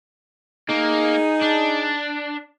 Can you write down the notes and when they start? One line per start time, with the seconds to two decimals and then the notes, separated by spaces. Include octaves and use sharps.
0.69 A#3 D#4 G#4
1.42 D4